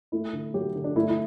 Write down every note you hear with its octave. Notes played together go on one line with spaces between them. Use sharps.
A3 E4
D3
F#3 G4
D3
D4
A3 E4
E4